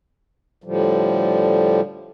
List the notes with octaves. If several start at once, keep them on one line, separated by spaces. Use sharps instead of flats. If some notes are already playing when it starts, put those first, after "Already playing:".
A2 D3 F3 G3